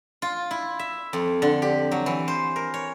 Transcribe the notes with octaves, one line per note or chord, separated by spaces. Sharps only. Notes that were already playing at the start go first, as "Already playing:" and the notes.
F4
E4
E5
F2
D3
G4
F#3
E3
C5
A#4
C#5